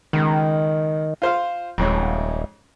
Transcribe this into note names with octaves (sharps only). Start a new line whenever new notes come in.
C#2 D#3
F4 C5 F5
D#1 F2 G#2 C#4